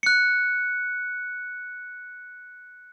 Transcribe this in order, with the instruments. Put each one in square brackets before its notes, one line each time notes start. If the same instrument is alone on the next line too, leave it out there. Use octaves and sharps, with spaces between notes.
[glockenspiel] F#6 C#7